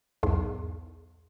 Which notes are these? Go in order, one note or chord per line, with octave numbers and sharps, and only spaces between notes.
B1 E2 G#2